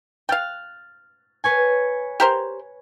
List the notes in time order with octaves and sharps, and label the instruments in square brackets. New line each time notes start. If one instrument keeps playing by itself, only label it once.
[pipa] F5 G5 [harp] F6 F#6 A6
[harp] B4 C#5 G#5
[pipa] G4 A#4 C5